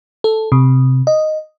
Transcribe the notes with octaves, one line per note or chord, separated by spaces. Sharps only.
A4
C3
D#5